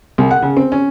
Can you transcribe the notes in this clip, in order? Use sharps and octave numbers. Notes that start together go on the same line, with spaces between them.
C2
F#5
C#3
C4
C#4